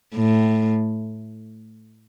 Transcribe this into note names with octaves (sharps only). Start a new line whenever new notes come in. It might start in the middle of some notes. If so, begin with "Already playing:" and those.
A2